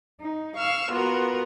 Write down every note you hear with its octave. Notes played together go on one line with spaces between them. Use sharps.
D#4
F5 C#6 E6 F6
B3 F4 F#4 A#4